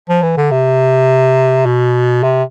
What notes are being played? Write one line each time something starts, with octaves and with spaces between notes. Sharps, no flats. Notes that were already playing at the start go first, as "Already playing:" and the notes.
F3
E3
D3
C3
B2
C3